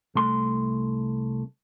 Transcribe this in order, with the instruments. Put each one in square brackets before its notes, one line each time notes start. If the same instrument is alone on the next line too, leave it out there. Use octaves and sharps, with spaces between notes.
[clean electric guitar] C2 A3 C6